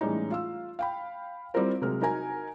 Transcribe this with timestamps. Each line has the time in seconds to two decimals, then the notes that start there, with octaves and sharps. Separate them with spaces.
0.01 A2 E3 G3 G#3 C#4 D#4
0.30 F4 F5 E6
0.79 F5 G5 B5
1.54 G3 C4 E4 F4 A#4 C5
1.81 C3 F#3 G#3 A#4 F6
2.02 D#4 F#4 A#4 G#5 A#5